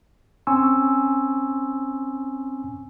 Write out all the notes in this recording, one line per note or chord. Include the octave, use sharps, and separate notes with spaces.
C4 C#4 G#5 C6 C#6 E6